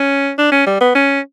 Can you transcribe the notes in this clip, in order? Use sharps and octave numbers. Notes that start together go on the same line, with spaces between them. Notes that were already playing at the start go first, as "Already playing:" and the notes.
Already playing: C#4
D4
C#4
G3
B3
C#4